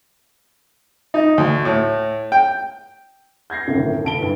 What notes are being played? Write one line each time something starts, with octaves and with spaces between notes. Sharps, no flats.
D#4
D2
A2
G5
G6 G#6 A#6 C7
G1 C2 F#2 A2 D#3
D2 A5 D7 G7
G2 E4 B4